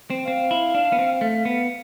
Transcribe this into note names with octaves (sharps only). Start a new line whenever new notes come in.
C4
C4 F5
E4
D4
B3
C4
A3
B3